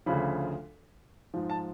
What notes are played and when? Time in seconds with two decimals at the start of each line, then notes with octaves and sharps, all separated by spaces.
0.06 D2 C#3 F3 B5
1.34 G#2 F3
1.50 A5